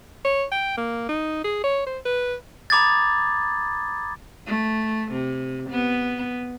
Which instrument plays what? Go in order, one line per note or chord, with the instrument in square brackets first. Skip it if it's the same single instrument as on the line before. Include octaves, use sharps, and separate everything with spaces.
[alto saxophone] C#5
G5
A#3
D#4
G#4
C#5
C5
B4
[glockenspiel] A#5 B5 D6 D#6 G#6 A6
[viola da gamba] A3
C3
B3